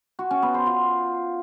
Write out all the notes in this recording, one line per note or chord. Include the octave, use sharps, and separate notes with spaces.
F#4
C#4
B3
C5
F4